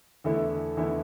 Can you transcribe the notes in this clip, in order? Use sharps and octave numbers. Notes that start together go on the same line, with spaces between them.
E2 D3 A3 E4
E2 D3 A3 E4